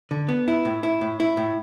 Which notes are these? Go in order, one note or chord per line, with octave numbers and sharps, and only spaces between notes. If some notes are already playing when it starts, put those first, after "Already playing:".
D3
B3
E4
A2
E4
A2
E4
A2